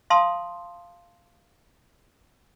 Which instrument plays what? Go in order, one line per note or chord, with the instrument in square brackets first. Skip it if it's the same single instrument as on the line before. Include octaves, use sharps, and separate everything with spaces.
[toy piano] F5 A5 C6 D#6